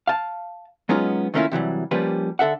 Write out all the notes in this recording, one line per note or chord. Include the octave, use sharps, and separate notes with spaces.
F5 A5
F#3 G#3 B3 C#4 D#4 F4
D#3 A3 A#3 C#4 E4 F4
C3 E3 F#3 G3
F3 G3 A#3 C#4 G4 B4
D3 A4 E5 F#5